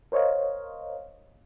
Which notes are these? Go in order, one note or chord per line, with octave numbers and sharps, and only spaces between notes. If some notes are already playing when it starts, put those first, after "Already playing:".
A#4 C5 C#5 D#5 F5